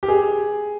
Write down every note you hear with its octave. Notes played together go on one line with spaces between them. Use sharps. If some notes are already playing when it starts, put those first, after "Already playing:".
G4
G#4